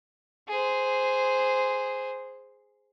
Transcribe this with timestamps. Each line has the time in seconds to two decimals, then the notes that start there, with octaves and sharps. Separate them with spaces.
0.48 G#4 C5